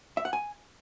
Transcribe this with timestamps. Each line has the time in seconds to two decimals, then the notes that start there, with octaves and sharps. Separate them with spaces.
0.17 E5
0.25 F#5
0.33 G#5